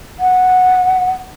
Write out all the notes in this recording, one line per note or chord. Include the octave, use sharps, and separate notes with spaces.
F#5